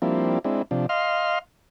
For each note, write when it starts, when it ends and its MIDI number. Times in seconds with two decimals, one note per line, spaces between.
0.02 0.39 53
0.02 0.39 55
0.02 0.39 58
0.02 0.39 60
0.02 0.39 62
0.02 0.39 64
0.44 0.62 56
0.44 0.62 60
0.44 0.62 62
0.44 0.62 64
0.71 0.86 48
0.71 0.86 53
0.71 0.86 62
0.89 1.39 75
0.89 1.39 77
0.89 1.39 84
0.89 1.39 89